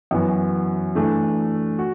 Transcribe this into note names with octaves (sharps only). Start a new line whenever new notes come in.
F#2 E3 B3 F#4
E3 A3 D4
F#4